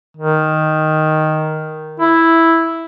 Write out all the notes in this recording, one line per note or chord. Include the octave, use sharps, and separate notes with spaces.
D#3
E4